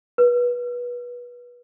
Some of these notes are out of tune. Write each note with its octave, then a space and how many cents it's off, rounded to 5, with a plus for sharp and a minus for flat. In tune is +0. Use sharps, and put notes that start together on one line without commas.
B4 -25